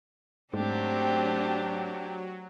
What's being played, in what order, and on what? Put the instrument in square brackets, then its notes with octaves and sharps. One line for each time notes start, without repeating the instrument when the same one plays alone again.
[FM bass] G#2 [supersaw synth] F#3 [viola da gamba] A3 C4 [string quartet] D4 G4